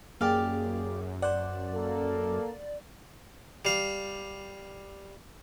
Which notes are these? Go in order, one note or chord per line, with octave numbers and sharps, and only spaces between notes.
F#2 A#3 G4 G#4 D5 F5
C5 D5 F#5
A#3 A4
G3 F5